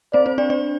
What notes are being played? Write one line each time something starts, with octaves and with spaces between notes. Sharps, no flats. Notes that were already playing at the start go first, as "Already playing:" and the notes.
C4 C5 D5
C4 C5
D4 D5
D4 D5